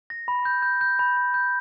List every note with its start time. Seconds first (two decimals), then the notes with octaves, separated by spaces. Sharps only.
0.10 A#6
0.28 B5
0.45 G6
0.62 G6
0.81 G6
0.99 B5
1.17 B5
1.34 G6